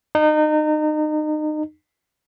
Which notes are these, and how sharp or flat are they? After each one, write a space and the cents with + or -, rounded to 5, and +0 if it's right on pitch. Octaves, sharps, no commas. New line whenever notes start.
D#4 -30